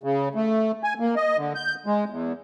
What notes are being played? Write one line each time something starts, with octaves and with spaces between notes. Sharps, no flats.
C#3
A3
G#5
A#3
D#5
D3
G6
G#3
E2